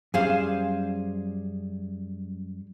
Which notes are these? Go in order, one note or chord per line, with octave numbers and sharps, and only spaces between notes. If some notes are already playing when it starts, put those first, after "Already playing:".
F#2 G3 G#4 C5 F5